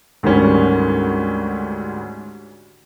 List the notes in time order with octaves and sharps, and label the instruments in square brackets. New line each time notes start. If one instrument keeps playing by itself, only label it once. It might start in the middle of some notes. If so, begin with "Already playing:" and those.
[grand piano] D2 G#2 D#3 G3 C#4